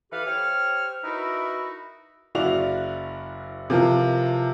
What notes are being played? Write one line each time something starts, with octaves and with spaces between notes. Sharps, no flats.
E3 G4 A4 B4 F5
G4 C5 C#5 F6
D#4 E4 F#4 A#4 B4 E5
F#1 E4 F#4 D5 F5 F7
C3 E3 F3 F4 A#4